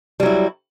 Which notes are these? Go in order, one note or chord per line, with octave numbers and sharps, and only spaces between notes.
F#3 G3 E4